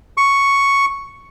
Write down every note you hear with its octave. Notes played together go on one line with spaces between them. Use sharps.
C#6